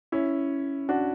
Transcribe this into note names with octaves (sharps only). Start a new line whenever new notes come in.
C#4 E4
D4 F#4